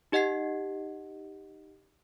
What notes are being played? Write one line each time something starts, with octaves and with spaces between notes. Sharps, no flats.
D#4 G4 D#5 F#5 G#6 C7